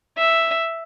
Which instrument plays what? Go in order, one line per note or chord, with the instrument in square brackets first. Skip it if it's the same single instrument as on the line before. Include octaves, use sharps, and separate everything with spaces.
[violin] E5